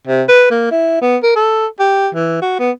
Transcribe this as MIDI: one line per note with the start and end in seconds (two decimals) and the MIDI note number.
0.07 0.23 48
0.28 0.47 71
0.50 0.67 58
0.71 1.00 64
1.01 1.16 59
1.23 1.35 70
1.36 1.66 69
1.80 2.09 67
2.14 2.38 52
2.42 2.55 66
2.59 2.70 59